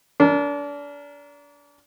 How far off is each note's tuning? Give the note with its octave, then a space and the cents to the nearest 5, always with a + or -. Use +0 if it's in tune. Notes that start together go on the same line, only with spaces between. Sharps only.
D4 -30 A#4 +0